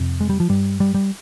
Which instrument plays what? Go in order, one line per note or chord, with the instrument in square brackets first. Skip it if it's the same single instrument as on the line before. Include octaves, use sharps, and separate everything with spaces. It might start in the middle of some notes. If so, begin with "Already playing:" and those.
Already playing: [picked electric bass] F2 C3
G#3
G3
F3
G2 G3
G3
G3